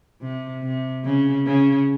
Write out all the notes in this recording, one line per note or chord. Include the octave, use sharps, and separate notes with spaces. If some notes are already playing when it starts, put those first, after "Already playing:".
C3
C3
C#3
C#3